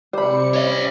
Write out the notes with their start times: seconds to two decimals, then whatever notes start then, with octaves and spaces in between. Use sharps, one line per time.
0.13 C3 G3 C4 C5 B5 C#7
0.53 C#4 C#5 D#5